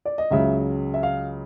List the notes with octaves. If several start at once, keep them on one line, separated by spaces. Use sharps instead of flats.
D5
D#5
C#2 C#3 F#3 E5
E5
F5